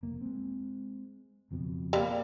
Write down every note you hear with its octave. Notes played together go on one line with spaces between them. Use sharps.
F1 A#3
G#3 C4
F#1 F2 B2
G3 A#3